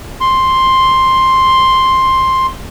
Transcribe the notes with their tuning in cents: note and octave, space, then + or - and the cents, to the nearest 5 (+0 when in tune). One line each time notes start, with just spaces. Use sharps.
C6 +5